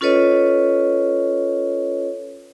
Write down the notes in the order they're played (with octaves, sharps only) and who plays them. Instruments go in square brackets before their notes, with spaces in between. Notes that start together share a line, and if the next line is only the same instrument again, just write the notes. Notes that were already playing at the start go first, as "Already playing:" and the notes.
[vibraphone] C#4 F4 A4 B4 C#5 D#5